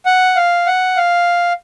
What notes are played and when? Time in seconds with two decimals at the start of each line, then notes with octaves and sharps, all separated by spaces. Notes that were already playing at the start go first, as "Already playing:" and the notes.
0.06 F#5
0.36 F5
0.67 F#5
0.97 F5